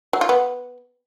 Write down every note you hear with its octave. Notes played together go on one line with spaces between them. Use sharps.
F#3
F4
B3